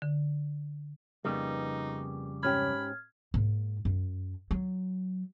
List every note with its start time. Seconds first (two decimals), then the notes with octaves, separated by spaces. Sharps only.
0.02 D3
1.25 F2 C#3 G3 A#3 B3 D#4
2.43 G#2 C#4 G4 B5 F6 G#6
3.34 G#2 A#3
3.85 F#2
4.51 F#3